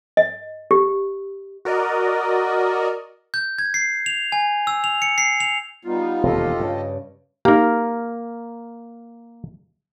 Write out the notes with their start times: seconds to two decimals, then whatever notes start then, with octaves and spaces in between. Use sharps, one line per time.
0.17 D#5
0.71 G4
1.65 F#4 A#4 D5 D#5
3.34 G6
3.58 G#6
3.74 C7
4.06 F7
4.32 G#5
4.67 E6
4.84 F7
5.02 C#7
5.18 C7
5.40 F7
5.85 G3 B3 D#4 F4
6.23 E1 D#2 C3 G4 A4 D#5
6.60 G2 C#3
7.45 A#3 D#4 G4 A#4